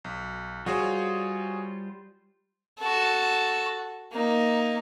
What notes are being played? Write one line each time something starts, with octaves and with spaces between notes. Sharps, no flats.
B1
G3 F4 F#4 G#4 C5 C#5
F#4 A4
A#3 D#4